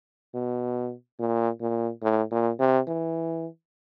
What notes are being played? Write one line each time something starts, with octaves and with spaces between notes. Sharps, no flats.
B2
A#2
A#2
A2
A#2
C3
E3